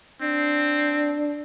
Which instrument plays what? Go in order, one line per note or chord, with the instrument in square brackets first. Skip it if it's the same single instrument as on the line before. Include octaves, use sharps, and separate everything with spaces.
[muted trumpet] C4 [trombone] D4